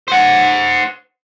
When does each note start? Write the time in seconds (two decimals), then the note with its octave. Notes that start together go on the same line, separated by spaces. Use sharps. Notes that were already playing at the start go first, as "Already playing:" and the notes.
0.08 C5 F#5